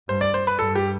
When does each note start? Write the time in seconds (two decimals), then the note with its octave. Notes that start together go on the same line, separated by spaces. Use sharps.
0.08 G2 C5
0.21 D5
0.34 C5
0.47 B4
0.59 G2 A4
0.75 G4